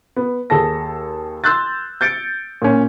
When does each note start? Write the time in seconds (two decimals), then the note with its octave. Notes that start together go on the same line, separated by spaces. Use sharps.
0.16 B3
0.50 D#2 G#4 A4 A5 A#6
1.44 C6 E6 F#6 G6 A6
2.01 G6 A6 C#7 D7
2.62 A#2 C#4